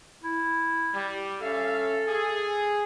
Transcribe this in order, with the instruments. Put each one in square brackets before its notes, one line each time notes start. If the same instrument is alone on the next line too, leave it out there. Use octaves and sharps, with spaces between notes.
[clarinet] E4
[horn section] G3
[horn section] C#4 E5 F5 [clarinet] A4
[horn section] G#4